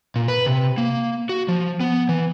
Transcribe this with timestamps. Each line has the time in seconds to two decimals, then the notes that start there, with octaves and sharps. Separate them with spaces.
0.16 A#2
0.28 B4
0.46 C3
0.78 A#3
1.29 F#4
1.48 F3
1.81 B3
2.09 E3